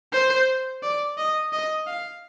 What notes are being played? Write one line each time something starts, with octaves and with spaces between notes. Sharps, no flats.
C5
D5
D#5
D#5
F5